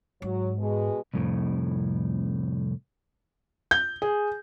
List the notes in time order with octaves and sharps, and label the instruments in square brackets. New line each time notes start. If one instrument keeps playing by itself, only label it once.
[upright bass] G#2 [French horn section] F#3
[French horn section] B2 G#3
[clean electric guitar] C2 F2 A2
[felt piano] G6
G#4